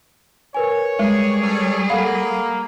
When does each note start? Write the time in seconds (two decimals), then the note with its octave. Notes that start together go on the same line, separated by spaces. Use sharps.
0.54 A#4 B4 C#5 G#5
0.99 G3 G#3 G#4
1.41 C#4 A4 C#5
1.90 A#3 A4 F5 F#5 B5